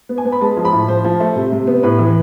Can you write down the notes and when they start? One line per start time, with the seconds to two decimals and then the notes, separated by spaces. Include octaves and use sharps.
0.09 B3
0.18 G#5
0.25 B3
0.32 B5
0.41 G#3 A5
0.57 F3
0.65 B5
0.73 A2
0.88 F3 C5
1.04 F3
1.20 A3
1.36 C3
1.52 C3
1.67 B3
1.83 A2 B4
1.99 E3